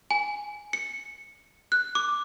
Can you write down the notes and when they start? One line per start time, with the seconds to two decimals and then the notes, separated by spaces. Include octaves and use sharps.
0.11 G#5
0.73 C#7
1.72 F#6
1.95 D6